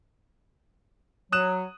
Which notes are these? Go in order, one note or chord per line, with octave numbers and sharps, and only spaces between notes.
F#3 D#6 F#6 E7